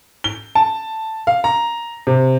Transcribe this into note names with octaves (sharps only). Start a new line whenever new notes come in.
G7
A5
F5
A#5
C3